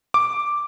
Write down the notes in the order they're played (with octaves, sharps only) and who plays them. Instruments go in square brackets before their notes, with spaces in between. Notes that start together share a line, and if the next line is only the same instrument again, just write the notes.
[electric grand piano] D6